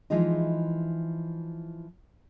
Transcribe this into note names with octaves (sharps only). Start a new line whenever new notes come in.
E3 F3 G#3 D#4